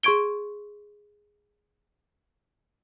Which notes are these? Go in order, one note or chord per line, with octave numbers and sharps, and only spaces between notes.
G#4 C6 C#6 G#6 D7 G7